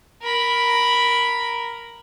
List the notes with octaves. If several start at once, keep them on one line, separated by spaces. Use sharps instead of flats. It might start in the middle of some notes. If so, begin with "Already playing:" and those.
A#4 B5